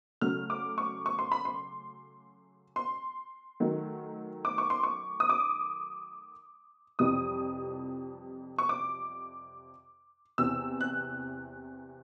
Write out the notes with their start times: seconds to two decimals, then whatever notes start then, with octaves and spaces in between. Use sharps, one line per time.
0.21 C#3 F#3 A3 F6
0.50 D6
0.78 C#6
1.06 C#6
1.19 C6
1.32 B5
1.45 C6
2.76 C6
3.60 D#3 F#3 A3
4.45 D6
4.58 C#6
4.70 C6
4.83 C#6
5.20 D#6
5.29 D6
6.99 F2 C3 E3 G3 D#6
8.58 C#6
8.69 D6
10.38 E2 C3 E3 E6
10.81 F#6